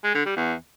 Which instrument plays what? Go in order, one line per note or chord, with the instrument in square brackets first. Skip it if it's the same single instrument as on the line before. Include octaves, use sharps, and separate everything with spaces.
[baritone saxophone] G#3
D3
G3
E2